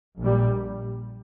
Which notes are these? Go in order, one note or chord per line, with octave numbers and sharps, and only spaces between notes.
A#1 A#2 G3